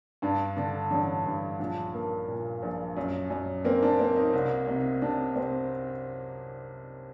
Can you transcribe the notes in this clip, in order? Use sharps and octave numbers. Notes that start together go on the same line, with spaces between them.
G2 D4
D3 D4
A1 D4
G2
A#1 D4
A#3
A#2
A#1
F#2
F#2
A#3 C4
D4
A#3 C4
D#4
C2
C3
C3 D4
C3 C4